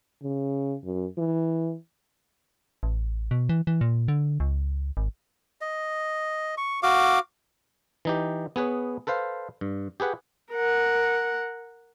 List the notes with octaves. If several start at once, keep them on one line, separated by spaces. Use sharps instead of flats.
C#3
F#2
E3
A1
B2
E3
E3
A#2
D3
C#2
G#1
D#5
C#6
F#4 F5 D6
E3 D#4 G4
B3 G#4 B4 C#5
A4 B4 C5 F5
G2
G4 G#4 B4 F#5
A#4 F#5